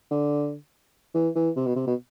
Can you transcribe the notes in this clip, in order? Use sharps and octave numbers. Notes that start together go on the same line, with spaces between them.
D3
E3
E3
C3
B2
C3
B2